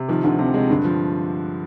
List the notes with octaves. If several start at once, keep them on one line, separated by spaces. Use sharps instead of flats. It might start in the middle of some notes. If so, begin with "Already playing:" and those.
Already playing: C3
D#3 F3
D2 D3
C3 F3
C3 G#3
G2 D3
F3